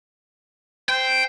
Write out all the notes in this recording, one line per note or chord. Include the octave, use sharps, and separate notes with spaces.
C5 G5